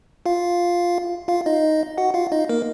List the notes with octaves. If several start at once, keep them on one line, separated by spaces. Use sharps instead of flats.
F4 F5
F4 F5
D#4 D#5
F#4 F#5
F4 F5
D#4 D#5
A#3 A#4